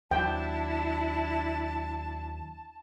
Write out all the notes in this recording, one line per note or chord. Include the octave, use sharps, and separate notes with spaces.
D#2 F#3 D4 E4 G5 A5